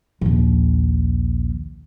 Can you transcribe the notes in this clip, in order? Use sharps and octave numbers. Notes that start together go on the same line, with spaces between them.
A#1 D#2